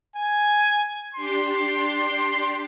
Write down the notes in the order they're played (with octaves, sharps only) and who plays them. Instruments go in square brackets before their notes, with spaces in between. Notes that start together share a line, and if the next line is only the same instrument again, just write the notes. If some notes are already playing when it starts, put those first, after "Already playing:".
[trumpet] G#5
[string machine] D4 G4 [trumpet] C6